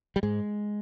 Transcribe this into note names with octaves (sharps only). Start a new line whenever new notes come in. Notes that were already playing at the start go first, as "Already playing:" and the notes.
G3
G#2 G#3